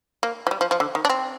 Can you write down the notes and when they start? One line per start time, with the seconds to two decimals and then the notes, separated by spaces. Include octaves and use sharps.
0.23 A#3
0.47 F3
0.51 G3
0.61 F3
0.71 F3
0.80 D3
0.95 D#3
1.05 D4
1.09 C4